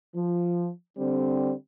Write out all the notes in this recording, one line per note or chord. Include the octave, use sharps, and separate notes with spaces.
F3
D3 G3 C4